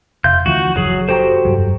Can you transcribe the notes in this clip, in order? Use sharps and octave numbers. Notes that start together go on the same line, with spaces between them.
F1 E5 F5 C6 G6
D2 E3 F3 F#4
F#1 F#3 G#4
F#4 G4 A4 C5 G5 A#5
F1 G2 F#3